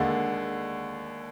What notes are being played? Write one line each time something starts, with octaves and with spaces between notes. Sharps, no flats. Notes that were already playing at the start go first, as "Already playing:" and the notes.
Already playing: D#2 D3 G#3 D#5 F#5